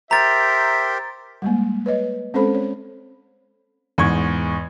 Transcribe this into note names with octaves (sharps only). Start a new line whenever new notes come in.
G4 A#4 C5 E5 A#5 A6
G3 G#3 A#3
B4 C#5 D#5
G#3 C4 C#4 A4 C5 B5
C#5
E2 G#2 C#6 G#6